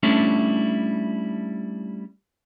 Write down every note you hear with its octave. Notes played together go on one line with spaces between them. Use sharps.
G3 A3 C#4 D4 E4